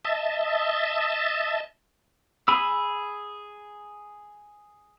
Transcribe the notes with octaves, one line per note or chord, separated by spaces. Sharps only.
D#5 E5 A5
G#4 B5 E6